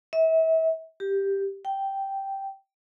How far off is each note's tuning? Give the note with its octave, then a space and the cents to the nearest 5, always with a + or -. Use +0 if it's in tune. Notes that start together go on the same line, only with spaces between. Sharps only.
E5 -35
G4 +5
G5 -5